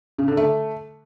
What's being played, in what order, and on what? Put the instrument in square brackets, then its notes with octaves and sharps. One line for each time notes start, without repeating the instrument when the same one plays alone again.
[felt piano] C#3
D3
A3